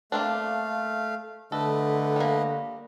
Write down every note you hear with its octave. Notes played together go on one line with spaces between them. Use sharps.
A3 A#3 C4 D4 F5
D3 A3 A4 B4 D#5
G3 A#3